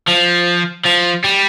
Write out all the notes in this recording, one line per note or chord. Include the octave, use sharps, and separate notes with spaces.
F3
F3
G3